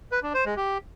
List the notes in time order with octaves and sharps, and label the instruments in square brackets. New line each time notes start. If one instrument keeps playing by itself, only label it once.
[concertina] B4
D4
C5
G#3
G4